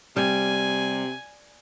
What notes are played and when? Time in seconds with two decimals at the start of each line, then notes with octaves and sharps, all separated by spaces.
0.16 C3 G3 G#5